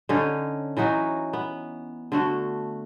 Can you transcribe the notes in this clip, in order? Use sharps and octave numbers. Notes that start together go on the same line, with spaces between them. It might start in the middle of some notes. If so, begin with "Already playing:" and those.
D3 C#4 D#4
E3 F#3 D#4 F#4
B3
D3 A3 F#4